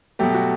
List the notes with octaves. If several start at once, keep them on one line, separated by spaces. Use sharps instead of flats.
B2 F#3 A3 G4
F#4